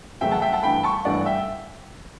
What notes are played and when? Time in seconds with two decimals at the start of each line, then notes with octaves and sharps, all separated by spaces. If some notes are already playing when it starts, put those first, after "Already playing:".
0.21 E2 C#3 F#3 A3 E5 G5
0.31 F#5 A5
0.42 E5 G5
0.52 F#5 A5
0.63 G1 G2 E3 A3 G5 B5
0.83 A5 C#6
1.05 G1 G2 E3 A3 D5 F#5
1.26 E5 G5